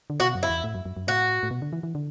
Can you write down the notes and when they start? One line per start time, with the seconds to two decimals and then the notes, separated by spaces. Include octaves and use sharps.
0.10 D3
0.20 B2 F#4
0.35 F#2
0.43 E4
0.50 E2
0.64 A2
0.75 F#2
0.86 F#2
0.97 F#2
1.07 A2 F#4
1.43 A2
1.51 B2
1.62 D3
1.73 E3
1.83 E3
1.95 D3